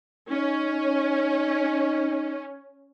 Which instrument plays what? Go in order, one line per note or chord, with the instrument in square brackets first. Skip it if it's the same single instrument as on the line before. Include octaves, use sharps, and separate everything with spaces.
[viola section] C#4 [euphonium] D#4